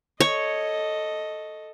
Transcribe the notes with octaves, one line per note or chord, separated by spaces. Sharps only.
A4 C#5 D#5